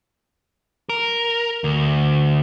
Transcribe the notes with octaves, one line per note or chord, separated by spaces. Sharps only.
A#4
D2